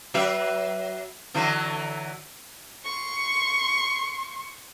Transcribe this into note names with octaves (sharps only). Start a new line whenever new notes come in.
F#3 B4 E5
D3 E3 F#3
C6 C#6